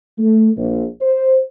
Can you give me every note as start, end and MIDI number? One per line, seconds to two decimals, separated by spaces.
0.19 0.49 57
0.57 0.85 34
1.01 1.39 72